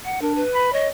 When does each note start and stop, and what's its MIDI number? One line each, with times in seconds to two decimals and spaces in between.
0.05 0.20 78
0.22 0.43 62
0.22 0.33 70
0.35 0.73 71
0.54 0.68 83
0.73 0.89 73
0.73 0.87 75